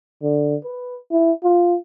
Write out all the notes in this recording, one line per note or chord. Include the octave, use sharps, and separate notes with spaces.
D3
B4
E4
F4